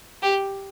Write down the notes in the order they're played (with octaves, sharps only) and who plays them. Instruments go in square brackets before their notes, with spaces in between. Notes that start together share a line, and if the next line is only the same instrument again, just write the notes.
[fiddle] G4